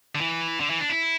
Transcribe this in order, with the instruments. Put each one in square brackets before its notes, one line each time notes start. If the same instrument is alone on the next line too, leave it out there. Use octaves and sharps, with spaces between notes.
[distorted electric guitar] D3
E3
D3
E3
D4
E4